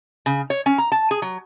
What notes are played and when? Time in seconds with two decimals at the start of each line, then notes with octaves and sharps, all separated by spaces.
0.26 C#3
0.50 C#5
0.66 C#4
0.78 A#5
0.92 A5
1.11 G#4
1.22 F#3